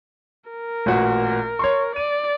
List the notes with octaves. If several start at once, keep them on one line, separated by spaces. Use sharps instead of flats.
A#4
A1 A#2 F#4
C#5 C6 C#6
D5 D#7